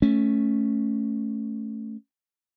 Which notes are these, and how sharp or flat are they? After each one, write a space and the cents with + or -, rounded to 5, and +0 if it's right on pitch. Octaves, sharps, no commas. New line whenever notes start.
A3 +0 C#4 +0